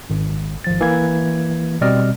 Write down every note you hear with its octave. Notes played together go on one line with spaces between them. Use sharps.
G#1
G#1 F3 A6
E3 A#3 G#6
B2 G3 C4 D5 D#5 F6